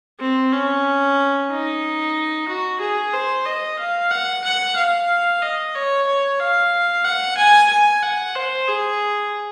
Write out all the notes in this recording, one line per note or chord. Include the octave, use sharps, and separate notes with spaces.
C4
C#4
D#4
F#4
G#4
C5
D#5
F5
F#5
F#5
F5
D#5
C#5
C#5
F5
F#5
G#5
G#5
F#5
C5
G#4